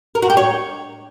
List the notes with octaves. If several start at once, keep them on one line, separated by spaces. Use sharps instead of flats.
A#4
F#4
G4
C#5